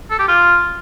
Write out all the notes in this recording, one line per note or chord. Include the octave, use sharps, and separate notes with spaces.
A4
G4
F4